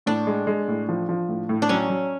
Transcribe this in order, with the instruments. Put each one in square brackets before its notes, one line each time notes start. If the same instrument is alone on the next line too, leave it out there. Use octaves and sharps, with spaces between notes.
[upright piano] A2 [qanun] D4
[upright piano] G#3
G#3
A2
F3
F3
A2
A2
[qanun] D4
[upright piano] F#3 [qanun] C#4
[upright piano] F#3